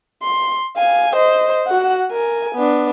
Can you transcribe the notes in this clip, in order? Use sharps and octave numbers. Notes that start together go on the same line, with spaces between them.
C6
F5 G#5
C5 D#5
F#4 F#5
A#4 G#5
B3 D4